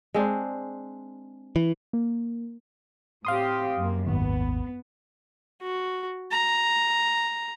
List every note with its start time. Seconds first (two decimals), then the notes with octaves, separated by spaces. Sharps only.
0.14 G#3 C4 D4
1.56 E3
1.93 A#3
3.25 A2 C4 G4 F5 C6 D#6
3.76 F#2 A#3
4.07 G#1 D#2 B3
5.62 F#4
6.31 A#5